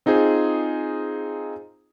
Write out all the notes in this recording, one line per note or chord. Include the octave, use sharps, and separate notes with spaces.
C4 D#4 F4 G#4 C5